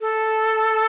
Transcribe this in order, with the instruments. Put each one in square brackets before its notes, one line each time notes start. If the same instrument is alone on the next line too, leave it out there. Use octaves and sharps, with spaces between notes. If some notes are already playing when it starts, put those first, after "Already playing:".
[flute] A4